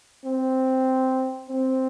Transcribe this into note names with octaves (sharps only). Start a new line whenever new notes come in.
C4
C4